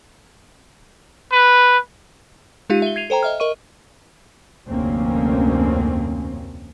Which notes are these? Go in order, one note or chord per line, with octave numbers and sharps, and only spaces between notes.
B4
G#3 D#4 F4 G4 F5 D#7
E5 G7
G#6 C7 D#7 F7
A4 C5 G5 A#5
D#5 E5 F6
A#4 D#5 C#6 D#7
F1 D2 G2 A#3 C4 C#4